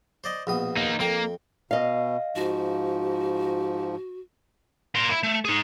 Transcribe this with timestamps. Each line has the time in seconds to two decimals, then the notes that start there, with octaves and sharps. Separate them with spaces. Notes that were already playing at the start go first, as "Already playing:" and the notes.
0.24 C5 D5 D#5
0.47 A#1 B2 D#6
0.77 A#3 D#4
1.00 F2 A#3 G5
1.71 B2 D#5 F5
2.36 G#2 F3 F#4
4.95 A#3 C6
5.10 E4
5.23 A3
5.45 D#4 G#4